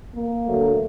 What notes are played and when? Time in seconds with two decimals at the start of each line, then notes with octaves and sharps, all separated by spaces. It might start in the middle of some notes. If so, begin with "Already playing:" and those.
0.11 A#3
0.46 D2 D3 F#3 A3